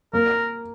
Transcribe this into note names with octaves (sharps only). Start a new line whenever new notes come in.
A#3 A#4